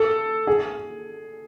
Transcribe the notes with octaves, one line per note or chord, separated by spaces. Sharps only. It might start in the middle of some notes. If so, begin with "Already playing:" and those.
Already playing: A4
G#4